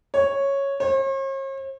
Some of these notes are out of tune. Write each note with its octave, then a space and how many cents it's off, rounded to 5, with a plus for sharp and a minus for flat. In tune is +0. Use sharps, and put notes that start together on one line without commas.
C#5 -5
C#5 -45